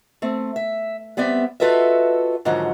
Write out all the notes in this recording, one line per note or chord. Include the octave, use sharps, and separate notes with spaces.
A3 C4
E5
G3 B3 C4 D5 E5
F4 F#4 A4 B4 D#5 E5
G#2 D3 D#3 F3 F#3